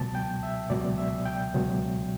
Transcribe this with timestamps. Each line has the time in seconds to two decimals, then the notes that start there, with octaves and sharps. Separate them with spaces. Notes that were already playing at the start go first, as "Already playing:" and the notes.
Already playing: C#2 B2 F#3 A5
0.15 G5
0.43 E5
0.70 C#2 B2 F#3 D5
0.98 E5
1.25 G5
1.53 C#2 B2 F#3